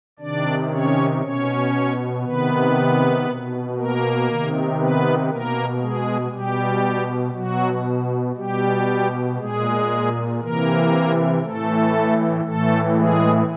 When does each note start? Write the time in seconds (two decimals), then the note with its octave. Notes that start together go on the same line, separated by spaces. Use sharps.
0.19 C3 D#3 D4 D5
0.70 C#4 C#5
1.22 B2 C#4 C#5
2.24 C3 D#3 B3 B4
3.26 B2
3.77 A#3 A#4
4.28 C3 D#3
4.79 B3 B4
5.29 B2 A#3 A#4
5.81 G#3 G#4
6.32 B2 G3 G4
7.34 B2 F#3 F#4
8.36 B2 G3 G4
9.38 A#2 G#3 G#4
10.40 C3 E3 A#3 A#4
11.42 A2 E3 A3 A4
12.45 A2 E3 A3 A4
12.95 G#3 G#4